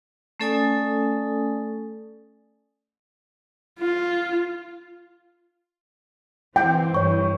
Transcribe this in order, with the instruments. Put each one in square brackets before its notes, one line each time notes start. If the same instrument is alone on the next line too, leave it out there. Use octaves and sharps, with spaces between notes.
[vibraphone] A3 C#4 A4 D5 G#5 D#6
[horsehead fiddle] F4
[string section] E3 C4 [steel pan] G5
[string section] G2 E3 [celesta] C#5 C#6